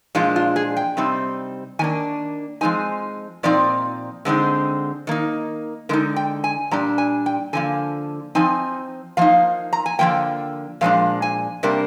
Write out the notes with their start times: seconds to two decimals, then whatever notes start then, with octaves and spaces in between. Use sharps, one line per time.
0.15 A#2 F3 G#3 D4 F4
0.36 F4
0.56 G#4
0.77 G5
0.97 C3 G3 C4 D#4
1.79 D#3 A#3 D4 G#5
2.61 F3 G#3 C4 D#4 G#5
3.43 A#2 F3 C4 D#4 D5
4.25 D3 G#3 C4 D#4
5.07 D#3 A#3 D#4
5.89 D3 G#3 D#4 A#4
6.16 G5
6.44 G#5
6.71 A#2 G3 D4 A#5
6.98 G#5
7.26 G5
7.53 D3 F3 A#3 G#5
8.35 F3 C4 D#4 G#5
9.17 F3 A#3 D#4 F5
9.73 A#5
9.86 G#5
9.99 D3 F3 A#3 G5
10.81 A#2 F3 G#3 D4 F5
11.22 G#5
11.63 C3 G3 A#3 D4 A#4